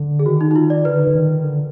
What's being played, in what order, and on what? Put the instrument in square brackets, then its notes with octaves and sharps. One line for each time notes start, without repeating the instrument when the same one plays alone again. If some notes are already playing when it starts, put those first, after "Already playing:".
Already playing: [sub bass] D3
[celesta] G#4
[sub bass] D#3 [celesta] F#4
[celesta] D#4
D#4
F4
D5
[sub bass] D3 [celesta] B4
[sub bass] D3
D#3
D3